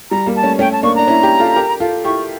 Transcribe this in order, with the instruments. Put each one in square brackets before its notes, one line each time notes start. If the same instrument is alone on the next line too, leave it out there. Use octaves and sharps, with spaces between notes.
[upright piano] G3 [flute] A#5
[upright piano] G3 A#3
[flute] A5
[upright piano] A3 C#4
[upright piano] A3 C#4 [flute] G5
[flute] A5
[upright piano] A#3 D4 [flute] C#6
[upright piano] D4 [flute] A#5
[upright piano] C#4 E4
E4 G4
F4 A4
G4 A#4
F4 A4
[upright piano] E4 G4 [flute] C#6